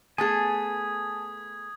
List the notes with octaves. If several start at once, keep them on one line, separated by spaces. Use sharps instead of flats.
A3 B3 G#4 G#5 A5 D#6 G#6